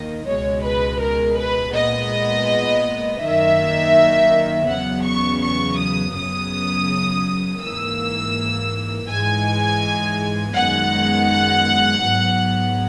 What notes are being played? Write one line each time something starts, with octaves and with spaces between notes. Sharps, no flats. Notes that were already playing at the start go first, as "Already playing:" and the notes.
Already playing: D#2 D#3 A#3 D#5
C#2 B2 G#3 C#5
B4
A#4
B4
A#2 G#3 B3 D#5
F#2 D#3 A#3 E5
E2 C#3 F#3 B3 F#5
C#6
C#6
D#6
F#2 C#3 F#3 B3 D#6
G#2 E3 A#3 E6
G#2 E3 G#3 G#5
F#2 D#3 G#3 B3 F#5
G#2 F#3 B3